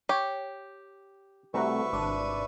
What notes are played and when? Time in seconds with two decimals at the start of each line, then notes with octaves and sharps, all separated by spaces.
0.09 G4 C#5
1.54 C2 C3 A3 F#4 B4 E5 A#5 C#6
1.93 G#1 D4 D#7